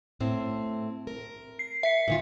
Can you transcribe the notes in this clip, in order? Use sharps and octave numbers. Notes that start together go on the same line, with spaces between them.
A2 C4
A#4
C7
E5 B6 C#7
A#2 D#3 F4